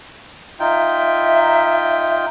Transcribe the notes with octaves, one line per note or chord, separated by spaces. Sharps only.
D#4 F4 E5 G5